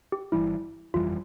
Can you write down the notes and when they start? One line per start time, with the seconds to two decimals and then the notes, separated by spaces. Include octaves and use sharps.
0.12 G4
0.32 G1 F2 E3 G3 E4
0.94 G1 F2 E3 G3 F4